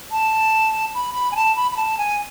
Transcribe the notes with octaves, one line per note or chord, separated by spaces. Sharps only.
A5
B5
B5
G#5
A5
B5
B5
A5
G#5